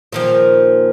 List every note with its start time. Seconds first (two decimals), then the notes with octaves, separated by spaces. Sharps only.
0.12 A#2 D#3 F3